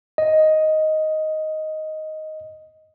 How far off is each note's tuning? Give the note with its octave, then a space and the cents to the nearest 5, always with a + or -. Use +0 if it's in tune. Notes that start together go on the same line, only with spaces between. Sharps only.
D#5 +5